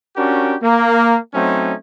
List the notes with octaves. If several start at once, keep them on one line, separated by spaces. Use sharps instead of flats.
C#4 D4 F#4 G4 A#4
A#3
F#3 A3 C4 C#4 D#4